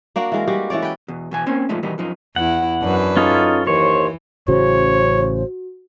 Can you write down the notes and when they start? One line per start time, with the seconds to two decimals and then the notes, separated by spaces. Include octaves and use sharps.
0.16 A#3 D4 F#4
0.32 E3 G#3 A#4
0.48 G3 G#3 F#4 G4
0.70 E3 C#4 C#5 D5
0.82 B4 G5
1.08 E2 B2
1.31 B2 E3 G#5
1.46 A#3 C4 C#4 C5 G#5
1.69 F2 A#2 F3 G#3 A3 D#4
1.83 B2 D#3 E3 G3 B3 D#4
1.98 F#2 F3 D#4
2.36 E2 E4 F#5
2.82 F#2 D4 B4
3.17 C#4 D#4 F4 A4
3.67 D#2 E3 C5 C#5
4.48 A1 C#3 F#4 C5 C#5